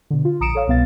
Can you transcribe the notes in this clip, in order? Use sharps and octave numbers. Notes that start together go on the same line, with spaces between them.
B2 D3
F4
A#1 A#5 D#6 C#7 D7 E7
A4 C#5 F5
C2 B2 B3 F5 A6